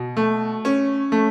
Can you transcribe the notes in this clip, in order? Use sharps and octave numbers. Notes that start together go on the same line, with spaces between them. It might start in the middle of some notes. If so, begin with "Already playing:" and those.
Already playing: B2
A3
C#4
A3